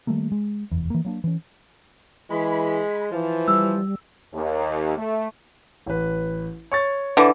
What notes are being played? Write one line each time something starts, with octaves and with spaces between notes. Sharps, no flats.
D#3 G3 A3 A#3
G#3
F1 E2
E3 A#3
F#3 A#3 D4
E3 C#4
E3 G#3 B5
E3 F3
G3 E6
D#2
A3
A1 B4
C#5 C#6 A6
D3 E3